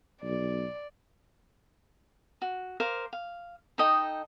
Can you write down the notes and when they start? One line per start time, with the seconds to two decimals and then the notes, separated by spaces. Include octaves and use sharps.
0.23 B1 D5
2.42 F#4
2.80 A#4 C5 F5 D6
3.13 F5
3.78 D#4 A4 D#5 G5